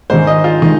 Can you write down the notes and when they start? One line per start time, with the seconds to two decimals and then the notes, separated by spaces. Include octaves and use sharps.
0.10 G#2 D#3 G#3 C5
0.27 D#5
0.44 F4
0.62 D#3 G#3 D#4